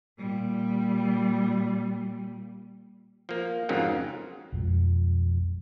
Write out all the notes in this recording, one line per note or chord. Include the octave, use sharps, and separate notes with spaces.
A#2 G3
F3 A#3
F2 G#2 C#3 F#3 A#3
B1 F2 F3 G#3